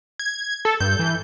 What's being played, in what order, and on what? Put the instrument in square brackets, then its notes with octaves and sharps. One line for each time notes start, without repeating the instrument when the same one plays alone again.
[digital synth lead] G#6
A4
[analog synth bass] G2 [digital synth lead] G6
[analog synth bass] E3